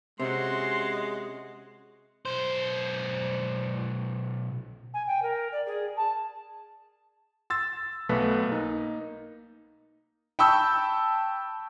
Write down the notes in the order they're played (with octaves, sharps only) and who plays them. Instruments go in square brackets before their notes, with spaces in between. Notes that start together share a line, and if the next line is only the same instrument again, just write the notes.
[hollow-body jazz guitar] C3 [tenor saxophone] G#3 [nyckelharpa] C#4 F#4 [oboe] C6
[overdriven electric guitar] B1 C5
[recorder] G#5
G5
A#4
D5
G#4
A5
[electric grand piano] C6 E6 A6
B1 A3 B3 B4
A#3 D#4
[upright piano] G5 A5 B5 C#6 E6 G6